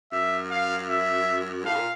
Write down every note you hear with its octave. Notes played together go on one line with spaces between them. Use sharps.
F#2 E5
F5
E5
A2 F5
A#2